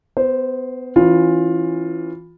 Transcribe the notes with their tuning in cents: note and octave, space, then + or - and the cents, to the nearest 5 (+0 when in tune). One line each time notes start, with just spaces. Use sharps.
B3 +30 C5 +0
E3 +0 C#4 -20 F4 +15